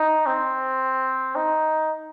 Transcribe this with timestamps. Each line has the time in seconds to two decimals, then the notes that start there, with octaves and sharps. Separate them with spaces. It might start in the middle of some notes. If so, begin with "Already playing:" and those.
Already playing: D#4
0.26 C4
1.36 D#4